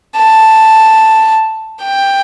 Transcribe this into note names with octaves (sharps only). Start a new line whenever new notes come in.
A5
G5